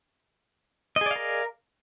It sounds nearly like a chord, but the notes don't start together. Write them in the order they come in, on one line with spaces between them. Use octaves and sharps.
D#5 G#4 D5 F5 A#4